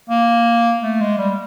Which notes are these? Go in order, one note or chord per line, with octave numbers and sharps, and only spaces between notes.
A#3
A3
G#3
G3